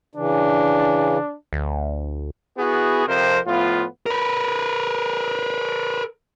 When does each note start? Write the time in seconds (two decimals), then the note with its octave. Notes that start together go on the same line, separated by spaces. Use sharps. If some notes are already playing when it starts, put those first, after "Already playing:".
0.15 C#3 E3 D4
1.53 D2
2.58 B3 E4 F#4 G#4
3.07 F2 C3 F3 A#4 C5
3.46 A2 F3 B3 F4
4.06 A#4 B4